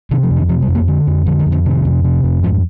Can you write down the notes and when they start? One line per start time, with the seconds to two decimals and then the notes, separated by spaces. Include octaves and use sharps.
0.11 C3 D#3
0.23 F3
0.30 F2
0.37 D#3
0.49 C3 F3
0.62 G3
0.68 F2
0.75 A#3
0.88 D3
1.07 F2
1.26 D3 F3
1.39 D#3
1.46 F2
1.52 D3
1.66 C3 D#3
1.85 F2
2.04 C3
2.24 F2
2.43 G#2 F3